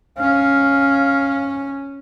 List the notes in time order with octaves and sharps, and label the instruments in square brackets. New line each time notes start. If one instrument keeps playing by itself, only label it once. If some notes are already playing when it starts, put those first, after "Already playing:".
[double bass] C#4 [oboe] F5